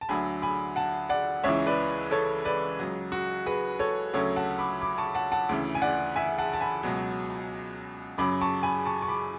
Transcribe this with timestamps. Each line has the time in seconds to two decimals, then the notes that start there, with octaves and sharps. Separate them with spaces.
0.01 A5
0.09 D2 D3 F#3 G#5 B5
0.42 G#5 B5
0.76 F#5 A5
1.09 D5 F#5
1.44 C#2 C#3 E3 C#5 E5
1.66 B4 D5
2.11 A4 C#5
2.45 B4 D5
2.79 C#2 C#3 F#3
3.12 F#4
3.46 G#4 B4
3.79 A4 C#5
4.13 D2 C#3 F#3 A4 C#5
4.36 F#5 A5
4.59 B5 D6
4.81 B5 D6
4.98 A5 C#6
5.15 F#5 A5
5.32 F#5 A5
5.49 D2 C#3 E3
5.75 G#5
5.82 D5 F#5
6.16 E5 G#5
6.38 F#5 A5
6.53 A5
6.61 G#5 B5
6.83 C#2 B2 F#3
8.18 F#2 C#3 F#3 B5 D6
8.41 A5 C#6
8.63 G#5 B5
8.85 A5 C#6
9.02 C#6
9.08 B5 D6